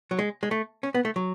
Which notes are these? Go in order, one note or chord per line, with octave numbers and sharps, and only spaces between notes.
F#3
G#3
G#3
A3
C#4
B3
A3
F#3